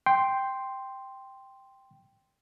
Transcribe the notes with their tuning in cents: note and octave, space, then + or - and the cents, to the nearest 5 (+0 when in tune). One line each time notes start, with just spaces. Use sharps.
G5 +0 C6 +0